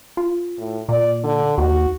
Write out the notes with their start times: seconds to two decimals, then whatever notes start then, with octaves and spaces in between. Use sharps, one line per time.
0.17 F4
0.58 A2
0.89 A#2 D5
1.24 D3
1.58 D#2 F#4